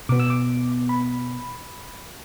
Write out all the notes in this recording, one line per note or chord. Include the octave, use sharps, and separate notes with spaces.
B2 B3 D6
E6
D6
B5